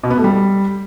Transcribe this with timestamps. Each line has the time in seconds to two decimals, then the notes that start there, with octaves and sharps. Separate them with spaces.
0.03 B2
0.10 B3
0.17 A3
0.24 G3